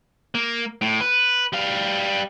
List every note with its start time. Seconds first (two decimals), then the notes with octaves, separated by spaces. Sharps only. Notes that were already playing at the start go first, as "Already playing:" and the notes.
0.35 A#3
0.82 A2
1.01 B4
1.53 G3 F5